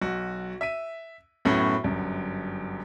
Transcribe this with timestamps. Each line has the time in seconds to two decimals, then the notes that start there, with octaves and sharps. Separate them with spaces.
0.02 B1 F#4
0.61 E5 B6 D#7
1.45 F#2 A2 B3 C#4 F#4
1.84 G1 F#2